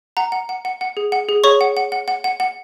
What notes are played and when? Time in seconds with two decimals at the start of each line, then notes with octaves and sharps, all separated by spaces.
0.17 F#5 A#5
0.32 F#5
0.49 F#5
0.65 F#5
0.81 F#5
0.97 G#4
1.12 F#5
1.29 G#4
1.44 G#4 C#5 C#6
1.61 F#5
1.77 F#5
1.92 F#5
2.08 F#5
2.24 F#5
2.40 F#5